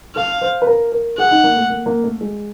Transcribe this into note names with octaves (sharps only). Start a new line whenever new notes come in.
A4 F5
C5
B4
A#4
A#4
G#4 F#5
D#4
A#3
A3
A#3
A#3
A3
G#3